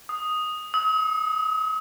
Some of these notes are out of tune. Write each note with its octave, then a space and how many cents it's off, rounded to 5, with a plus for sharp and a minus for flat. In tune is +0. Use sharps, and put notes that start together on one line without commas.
D#6 +0
D#6 +45
D#6 +45